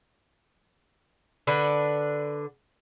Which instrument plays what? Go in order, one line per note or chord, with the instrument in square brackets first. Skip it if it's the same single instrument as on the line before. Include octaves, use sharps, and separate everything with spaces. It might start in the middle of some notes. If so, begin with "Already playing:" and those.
[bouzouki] D3 D4 B4